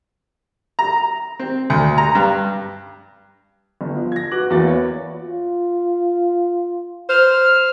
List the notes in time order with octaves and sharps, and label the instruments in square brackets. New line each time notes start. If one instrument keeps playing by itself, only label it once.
[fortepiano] A#5
C4
D2
A#5
G2
[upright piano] G1
F3
G#6 A#6
F#4 B4 D6 F#6 F#7
E2 A#3 F#4 B4 A6
C#5
[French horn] F4
[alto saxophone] C5 [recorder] F6